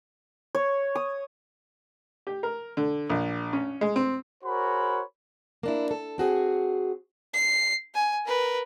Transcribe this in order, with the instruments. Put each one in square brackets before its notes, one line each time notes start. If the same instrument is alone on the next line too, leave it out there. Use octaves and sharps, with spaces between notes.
[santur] C#5
D#6
[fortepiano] G4
A#4
D3
A#1
C#4
G#3
C4
[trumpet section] F#4 G#4 A#4 C5 C#5 B5
[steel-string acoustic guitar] A#3 D4 E4
A4
C4 F#4 G#4
[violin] C7
G#5
A#4 B4